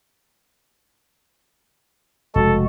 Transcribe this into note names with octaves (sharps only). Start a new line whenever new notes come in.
F1 B2 G#3 F#4 A4